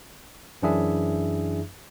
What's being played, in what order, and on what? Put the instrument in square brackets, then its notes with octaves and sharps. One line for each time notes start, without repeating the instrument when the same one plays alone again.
[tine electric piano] F#2 E3 D4 E4 G#4 E5